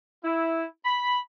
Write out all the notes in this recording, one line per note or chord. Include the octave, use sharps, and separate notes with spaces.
E4
B5